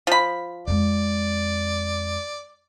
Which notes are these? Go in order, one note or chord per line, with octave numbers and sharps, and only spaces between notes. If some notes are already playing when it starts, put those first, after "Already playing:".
F3 B5
F2 G#3 D5